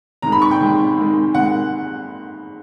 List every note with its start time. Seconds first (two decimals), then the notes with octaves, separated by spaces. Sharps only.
0.22 C3 D#3 G#3 A#5
0.32 B5
0.42 C#6
0.51 G5
0.61 C3 D#3 G#3
0.97 C3 D#3 G#3
1.35 C3 D#3 G#3 F#5